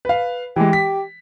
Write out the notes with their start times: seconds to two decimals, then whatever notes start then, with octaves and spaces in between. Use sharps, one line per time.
0.05 B4 F5
0.56 E3 G#3 G4
0.73 B6